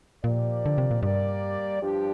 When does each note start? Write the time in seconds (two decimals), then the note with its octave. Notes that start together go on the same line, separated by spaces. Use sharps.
0.24 A#2 F3 A#3 G4 D5
0.66 D3
0.78 C3
0.91 A#2
1.03 G2 G3 A#3 G4 A#4 D5
1.81 G2 F3 D4 G4